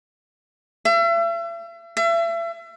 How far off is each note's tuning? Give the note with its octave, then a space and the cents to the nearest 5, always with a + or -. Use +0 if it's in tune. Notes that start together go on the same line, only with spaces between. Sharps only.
E5 +40
E5 +35